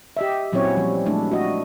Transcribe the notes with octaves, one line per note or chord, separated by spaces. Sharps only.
G4 D#5 E5
A#2 F#3 C4 C#4 E4 C#5
F3 G3
F#3 G#3 A3 D4 E4
F#4 D#5